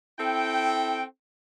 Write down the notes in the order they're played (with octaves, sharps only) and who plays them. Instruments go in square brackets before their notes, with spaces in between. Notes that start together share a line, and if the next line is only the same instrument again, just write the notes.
[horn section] C4 E4 A4 G5